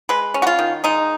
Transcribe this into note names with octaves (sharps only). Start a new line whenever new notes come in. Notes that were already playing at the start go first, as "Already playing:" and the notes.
G#3 B4
C#4
F#4
F4
D#3
G#3 D#4